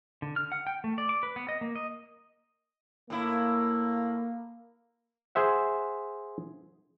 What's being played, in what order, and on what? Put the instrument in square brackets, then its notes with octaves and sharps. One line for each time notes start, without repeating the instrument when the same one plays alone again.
[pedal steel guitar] D3
F6
F#5
G5
A3
D5
D6
B4
B3
D#5
A#3
D#5
[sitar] A2 E4 [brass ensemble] A#3
[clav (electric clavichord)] G#4 C5 E5 F#5